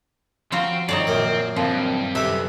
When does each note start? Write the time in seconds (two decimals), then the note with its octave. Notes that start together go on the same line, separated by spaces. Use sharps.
0.52 F3 C4 F4 F#4 A#5
0.89 C4 D#4 C#5 D5
1.07 F#2 A#2 D#3
1.56 G2 F3 F#3 C4
2.15 F#2 C3 A4 B4 E5 B5